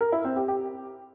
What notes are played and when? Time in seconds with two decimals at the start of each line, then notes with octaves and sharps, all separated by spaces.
0.01 A#4
0.12 E4
0.24 C4
0.36 G4
0.48 G4